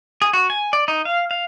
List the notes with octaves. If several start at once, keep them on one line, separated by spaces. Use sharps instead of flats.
G#4
F#4
G#5
D5
D#4
F5
F5